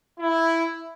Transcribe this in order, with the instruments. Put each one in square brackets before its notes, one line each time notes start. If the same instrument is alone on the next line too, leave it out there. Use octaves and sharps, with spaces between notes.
[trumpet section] E4